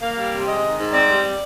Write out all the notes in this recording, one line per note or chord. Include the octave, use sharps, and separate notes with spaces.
A#3 F5
G3
C3
G#3 D#5
D#3
G#2
C4 D5
G3